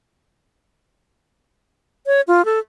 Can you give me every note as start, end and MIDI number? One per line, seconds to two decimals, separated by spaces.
2.06 2.21 73
2.27 2.44 65
2.45 2.59 69